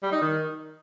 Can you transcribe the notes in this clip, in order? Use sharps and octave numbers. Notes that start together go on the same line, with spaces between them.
G3
D#4
D#3